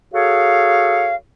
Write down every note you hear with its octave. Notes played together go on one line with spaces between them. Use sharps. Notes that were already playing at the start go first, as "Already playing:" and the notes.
F#4 G#4 A4 C#5 F5